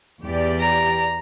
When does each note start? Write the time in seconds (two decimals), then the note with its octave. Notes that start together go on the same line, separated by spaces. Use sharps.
0.24 E2 G4 D5
0.60 A#5